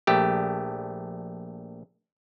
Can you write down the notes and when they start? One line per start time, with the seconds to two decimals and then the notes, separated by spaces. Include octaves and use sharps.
0.07 A#1 A3 G4